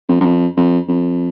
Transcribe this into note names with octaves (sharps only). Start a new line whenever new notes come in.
F2
F#2
F2
F2
F2